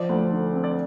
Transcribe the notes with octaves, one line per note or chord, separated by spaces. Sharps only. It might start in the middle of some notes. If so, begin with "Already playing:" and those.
Already playing: F3 D5
D2
D3
C4
D5